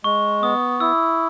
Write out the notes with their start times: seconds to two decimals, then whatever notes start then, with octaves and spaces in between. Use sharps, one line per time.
0.04 G#3 C#6
0.42 B3 D#6
0.80 E4 E6